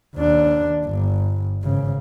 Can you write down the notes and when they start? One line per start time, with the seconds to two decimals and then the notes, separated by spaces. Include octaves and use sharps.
0.15 D#2 D4
0.86 G1
1.63 G#1 C#3